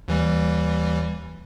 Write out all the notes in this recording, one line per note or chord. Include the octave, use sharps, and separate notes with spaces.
D#2 E3 G3